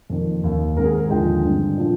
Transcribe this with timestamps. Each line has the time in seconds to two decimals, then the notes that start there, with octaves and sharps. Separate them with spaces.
0.10 F2 D#3 A#3
0.44 D#2 D#3 A#3
0.77 G#2 D#3 G#3 C4 A#4
0.85 G#4
0.94 A#4
1.10 D#2 D3 F3 G#3 G5
1.44 G2 D3 G#3 C4
1.78 A#2 F3